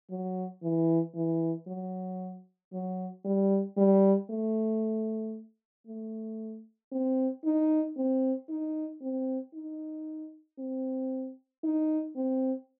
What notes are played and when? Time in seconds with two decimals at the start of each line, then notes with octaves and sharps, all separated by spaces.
0.10 F#3
0.63 E3
1.15 E3
1.68 F#3
2.73 F#3
3.25 G3
3.77 G3
4.30 A3
5.87 A3
6.92 C4
7.45 D#4
7.97 C4
8.49 D#4
9.02 C4
9.54 D#4
10.59 C4
11.64 D#4
12.16 C4